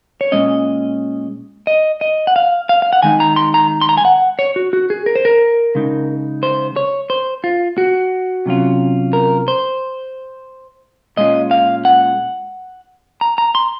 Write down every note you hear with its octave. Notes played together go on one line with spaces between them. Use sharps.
C#5
A#2 F3 G#3 C#4 D#5
D#5
D#5
F#5
F5
F5
F5
F#5
D#3 G#3 D#4 G#5
A#5
C6
A#5
C6
A#5
G#5
F#5
C#5
F#4
F#4
G#4
A#4
C5
A#4
C#3 G#3 D#4
C5
C#5
C5
F4
F#4
C3 F#3 C#4 F4
A#4
C5
A#2 G#3 C#4 F4 D#5
F5
F#5
A#5
A#5
C6